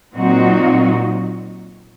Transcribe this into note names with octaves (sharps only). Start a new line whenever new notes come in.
A#2 F#3 C4 D#4 F#4